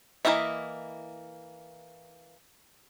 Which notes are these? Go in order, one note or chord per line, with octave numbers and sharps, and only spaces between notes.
E3 A#3 E4 D#5 E5